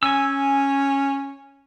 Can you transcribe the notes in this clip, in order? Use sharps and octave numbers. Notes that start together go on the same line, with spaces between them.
C#4 G#5 E6